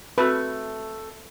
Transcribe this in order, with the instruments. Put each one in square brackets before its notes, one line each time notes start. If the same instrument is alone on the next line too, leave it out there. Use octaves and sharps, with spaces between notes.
[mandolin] A3 [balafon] C4 F#4 A4 [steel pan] B4